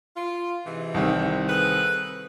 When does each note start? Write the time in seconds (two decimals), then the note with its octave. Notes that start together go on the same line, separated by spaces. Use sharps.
0.16 F4
0.66 G#2 C3 E3
0.94 C2 D#3 C4
1.49 G#4 A4 B4